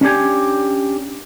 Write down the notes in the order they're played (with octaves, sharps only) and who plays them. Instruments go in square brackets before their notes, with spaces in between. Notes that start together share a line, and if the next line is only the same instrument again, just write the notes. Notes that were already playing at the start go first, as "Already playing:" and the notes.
[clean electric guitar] C#4 D4 G4 G#5